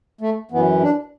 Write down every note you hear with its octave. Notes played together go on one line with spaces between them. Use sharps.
A3
F#2 E3 B3
D4